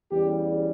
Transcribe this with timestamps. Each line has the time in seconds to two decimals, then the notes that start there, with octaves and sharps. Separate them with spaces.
0.11 E2 C#3 G3 G4